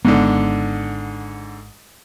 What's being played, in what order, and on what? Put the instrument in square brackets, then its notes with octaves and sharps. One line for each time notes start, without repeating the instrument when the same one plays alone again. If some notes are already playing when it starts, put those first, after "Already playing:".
[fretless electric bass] G#1 G#3 B3 [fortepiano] G#2 D3